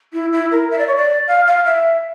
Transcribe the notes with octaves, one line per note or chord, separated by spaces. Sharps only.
E4
E4
A#4
E5
D5
C#5
D5
F5
F5
E5